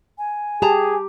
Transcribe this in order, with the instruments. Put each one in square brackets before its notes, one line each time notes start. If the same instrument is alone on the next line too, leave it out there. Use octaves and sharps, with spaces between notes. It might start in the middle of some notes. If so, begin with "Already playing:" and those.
[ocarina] G#5
[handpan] G4 [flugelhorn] G#4 [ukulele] A5 A#5